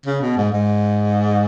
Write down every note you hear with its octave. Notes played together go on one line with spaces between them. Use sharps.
C#3
B2
G#2
G#2